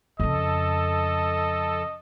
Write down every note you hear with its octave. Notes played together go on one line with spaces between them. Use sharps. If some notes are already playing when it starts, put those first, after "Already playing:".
F2 C#3 A4 D#5